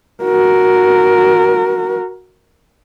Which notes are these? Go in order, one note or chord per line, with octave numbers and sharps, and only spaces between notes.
F#4 A#4